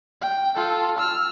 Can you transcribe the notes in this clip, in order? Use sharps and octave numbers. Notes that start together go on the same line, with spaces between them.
G5
F4 A4
E6 F6